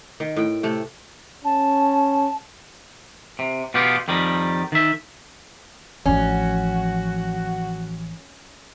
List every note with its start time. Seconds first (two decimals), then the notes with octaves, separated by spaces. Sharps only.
0.20 D#3
0.36 A2 G5
0.63 C3 A3
1.45 C#4 A5
3.39 C3
3.74 B2 B3 F4 G4
4.08 F2 D#3 G3
4.72 D#3 E5
6.06 A1 F3 C#4 F#4